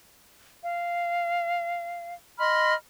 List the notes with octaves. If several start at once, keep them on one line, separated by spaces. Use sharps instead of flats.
F5
D#5 B5 C6 F6